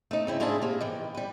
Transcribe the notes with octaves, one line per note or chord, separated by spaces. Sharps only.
A3 D#4
C#3 C4 E4
G#2 A#3 D4 E4 G#4 A5
C3 A#3
D#3 E3
G3 B4